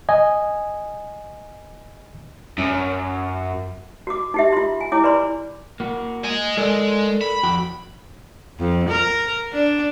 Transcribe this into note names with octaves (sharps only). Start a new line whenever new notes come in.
D#5 G#5
F#2
F#4 D6
D#4 G4 E5
F4 C6
G#5
E4 C#5 G#5 D6
B4 D5 B5 C6
A#3 F#4
D#5 G#5
G#3 A4 A#4 D5
B5
F2 F#4 G5
F2
A#4
D4